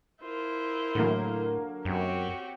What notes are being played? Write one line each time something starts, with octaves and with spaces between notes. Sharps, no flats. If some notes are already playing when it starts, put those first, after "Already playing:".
E4 F4 A#4 C5
A2 D3 F#3 A#3
F#2 C4 F#4 G4 C#5